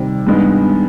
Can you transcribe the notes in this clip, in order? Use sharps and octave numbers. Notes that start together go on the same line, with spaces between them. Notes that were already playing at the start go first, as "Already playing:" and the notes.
Already playing: C3 D#3 G3 C4
G2 D#3 G#3 B3